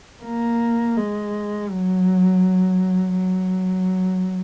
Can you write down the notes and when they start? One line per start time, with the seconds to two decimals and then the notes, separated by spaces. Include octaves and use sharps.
0.23 A#3
0.97 G#3
1.70 F#3
3.18 F#3